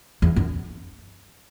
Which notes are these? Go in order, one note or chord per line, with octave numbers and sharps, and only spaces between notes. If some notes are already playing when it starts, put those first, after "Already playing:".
E2
F#2